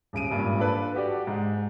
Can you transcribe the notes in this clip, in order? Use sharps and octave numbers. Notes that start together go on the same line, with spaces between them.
D#1 C#3 D7 D#7
G#1 G2 A#2
D4 F4 A4 B4
F#4 G4 D5
G#2